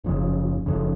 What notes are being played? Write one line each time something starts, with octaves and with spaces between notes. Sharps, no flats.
F#1 F2 C#3
F#1 F2 C#3